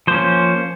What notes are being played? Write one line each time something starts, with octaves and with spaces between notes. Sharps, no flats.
F3 A#3 C#4 C5